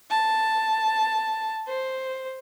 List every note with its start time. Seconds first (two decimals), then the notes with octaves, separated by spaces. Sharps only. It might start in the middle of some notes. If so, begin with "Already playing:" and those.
0.10 A5
1.67 C5